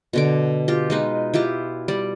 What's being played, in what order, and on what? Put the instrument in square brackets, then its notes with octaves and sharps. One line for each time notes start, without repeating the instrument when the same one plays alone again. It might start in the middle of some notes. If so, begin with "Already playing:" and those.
[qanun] B2 D3 D6
F4 G4
G#3 D#4 B4
E4 F4 G4 B4
G3 D5